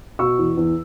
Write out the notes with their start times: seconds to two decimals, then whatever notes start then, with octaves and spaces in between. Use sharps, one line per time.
0.19 B2 C#6 E6
0.39 E2
0.57 E2